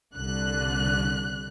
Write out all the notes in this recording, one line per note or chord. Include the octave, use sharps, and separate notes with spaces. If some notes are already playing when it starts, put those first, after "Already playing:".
C2 D3 F#6